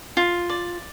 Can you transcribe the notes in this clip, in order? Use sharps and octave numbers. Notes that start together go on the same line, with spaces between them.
F4
D5